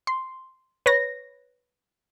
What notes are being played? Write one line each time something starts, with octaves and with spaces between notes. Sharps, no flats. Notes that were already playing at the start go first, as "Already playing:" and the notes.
C6
B4 C#5 A#6